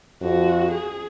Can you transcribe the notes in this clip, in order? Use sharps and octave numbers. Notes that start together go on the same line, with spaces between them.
F2 F#4
G#4